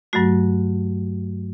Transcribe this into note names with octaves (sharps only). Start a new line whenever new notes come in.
G2 F#3 A3 F#4